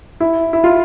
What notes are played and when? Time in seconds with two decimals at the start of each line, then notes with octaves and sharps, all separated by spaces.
0.20 E4
0.53 E4
0.64 F4